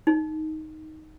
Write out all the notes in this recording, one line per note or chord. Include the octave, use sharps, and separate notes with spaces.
D#4